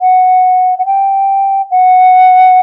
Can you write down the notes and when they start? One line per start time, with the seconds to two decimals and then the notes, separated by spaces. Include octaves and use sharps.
0.01 F#5
0.78 F#5
0.86 G5
1.71 F#5